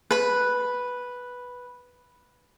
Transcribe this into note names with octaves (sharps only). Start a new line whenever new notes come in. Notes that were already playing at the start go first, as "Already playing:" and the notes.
B4 B5